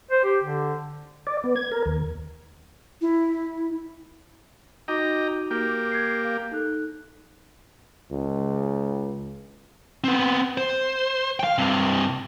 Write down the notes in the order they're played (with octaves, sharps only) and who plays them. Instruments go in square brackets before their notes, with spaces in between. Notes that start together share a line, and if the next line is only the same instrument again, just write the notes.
[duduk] C5
G4
D3
[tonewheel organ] D5
B3
G#6
A#4
D#2
[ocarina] E4
[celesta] D#4 F#4 D6 [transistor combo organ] D#5 G5 A#5
[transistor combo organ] A#3 G4
[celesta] G#6 C7
F5
D#4 A4 F#6
[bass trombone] C#2
[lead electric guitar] B3 C4
C5
F5 G5
G2 C3